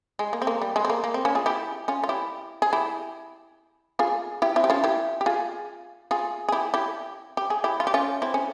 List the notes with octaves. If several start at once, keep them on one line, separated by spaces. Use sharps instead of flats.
G#3
A#3
C4
A#3
G3
G#3
C4
A#3
A#3
C4
A#3 C#4
F4 G#4
E4 G4
C#4 F4
F4
E4 G4
G#4
E4 G4
F4 G#4
E4 G4
C4 E4
G4
C#4 F4
E4 G4
G4
F4 G#4
F4 G#4
G#4
E4 G4
E4 G4
G4
G#4
E4 G4
F4
G4
C#4 F4
C4 E4
C#4